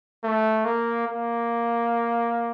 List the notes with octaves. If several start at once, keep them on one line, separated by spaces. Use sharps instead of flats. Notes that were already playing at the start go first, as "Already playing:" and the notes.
A3
A#3
A#3